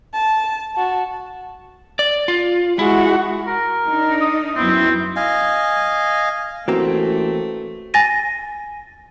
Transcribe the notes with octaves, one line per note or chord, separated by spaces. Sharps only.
A5
F#4 A5
D5
F4
G#3 E4 F#4
A#4
D4 D#4
D#6
F#2 B3 C4 E4
D#5 F5 G#5
A1 E3 A3 A#3 C4 F#4
G#5 A6 A#6 D#7